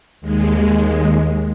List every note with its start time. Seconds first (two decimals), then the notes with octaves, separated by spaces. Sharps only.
0.21 D#2 G#3